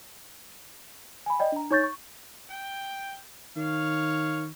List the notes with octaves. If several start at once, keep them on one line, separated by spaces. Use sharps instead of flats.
G#5 B5
D5 D#5 G5
D4 A#5
D#4 C#5 C#6 G6 A6
C#6
G5
D#3 C#5 F5